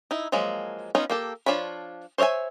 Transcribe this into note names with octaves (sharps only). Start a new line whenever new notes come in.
D#4 E4
F3 F#3 G#3 A#3
B3 C#4 D#4 F4 C#5
A#3 G4 A4
F3 D4 F4 C#5 B5
C5 C#5 D#5 E5 G#5